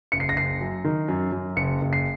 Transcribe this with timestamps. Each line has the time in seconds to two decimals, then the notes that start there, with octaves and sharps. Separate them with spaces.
0.12 F#1 C#7
0.20 C7
0.29 A#6
0.35 F#1 C7
0.61 F#2
0.84 D#3
1.08 F#2
1.32 F#2
1.56 F#1 C#7
1.82 F#1
1.93 C7